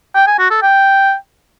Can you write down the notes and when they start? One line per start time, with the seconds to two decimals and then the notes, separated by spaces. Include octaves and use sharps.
0.15 G5
0.27 G#5
0.39 F#4
0.51 A4
0.63 G5